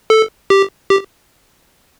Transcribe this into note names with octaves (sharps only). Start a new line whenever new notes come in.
A4
G4
G4